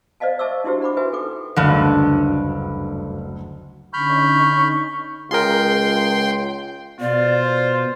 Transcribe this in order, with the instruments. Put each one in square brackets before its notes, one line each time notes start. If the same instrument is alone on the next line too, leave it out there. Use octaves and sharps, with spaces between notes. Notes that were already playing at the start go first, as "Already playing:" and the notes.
[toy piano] C5 D5 D#5 F5 A5
D#5 E5 A5 C#6 D6 E6
D4 E4 F#4 G4 C5
D4 F#5 B5 D6
D#4 F#4 B4 E5 G#5
A4 G5 D6
[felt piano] F#1 D2 [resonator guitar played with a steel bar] G2 D3
[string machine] D3 C#4 D#4 [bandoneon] B5 F6 G6 [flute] C#6
[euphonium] C#2 [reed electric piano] F4 G#4 A#4 [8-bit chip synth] G5 C6
[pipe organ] B2 [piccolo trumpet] F4 [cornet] C5 [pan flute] D5